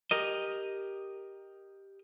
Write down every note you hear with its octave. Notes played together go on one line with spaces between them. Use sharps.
G4 A#4 D#5